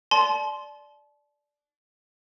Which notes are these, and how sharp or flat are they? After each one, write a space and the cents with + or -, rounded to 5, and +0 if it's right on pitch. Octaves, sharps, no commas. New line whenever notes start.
D5 +0 A5 -35 C6 +0